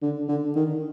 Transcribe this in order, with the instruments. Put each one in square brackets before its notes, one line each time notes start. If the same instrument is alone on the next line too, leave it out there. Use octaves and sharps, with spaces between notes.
[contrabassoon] D3
D3
D#3